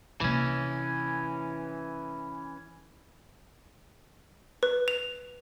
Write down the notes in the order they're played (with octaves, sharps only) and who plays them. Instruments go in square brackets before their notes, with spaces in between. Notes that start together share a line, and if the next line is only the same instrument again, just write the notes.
[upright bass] C3 A#3 [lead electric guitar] E3 C#4
[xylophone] B4
F7